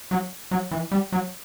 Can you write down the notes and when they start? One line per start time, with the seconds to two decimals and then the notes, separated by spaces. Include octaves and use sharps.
0.11 F#3
0.51 F#3
0.71 E3
0.92 G3
1.12 F#3